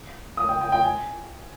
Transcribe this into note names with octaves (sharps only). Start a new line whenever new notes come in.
D#6
G5
G5
G5
G#5